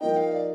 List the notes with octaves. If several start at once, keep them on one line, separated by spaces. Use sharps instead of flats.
F3 A#3 D#4 G5
F5
D5